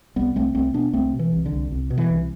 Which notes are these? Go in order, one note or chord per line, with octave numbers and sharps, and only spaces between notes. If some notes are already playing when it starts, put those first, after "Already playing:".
C2 G3 B3
C2 A3 C4
C2 A3 C4
B2 B3 D4
C2 A3 C4
B2
E3
C2
D3
C2
C2
B2
E3
C2